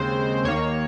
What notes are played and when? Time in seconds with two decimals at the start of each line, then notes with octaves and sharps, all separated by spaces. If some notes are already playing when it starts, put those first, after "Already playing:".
Already playing: D#2 C#3 G#3 C4 C5
0.44 D#2 D#3 A#3 C#5